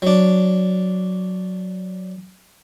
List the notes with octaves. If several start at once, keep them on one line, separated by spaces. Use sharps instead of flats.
F#3 D4